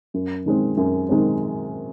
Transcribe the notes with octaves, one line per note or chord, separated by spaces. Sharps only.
F#2
D#3 G#3 C4
F#2
D#3 G#3 C4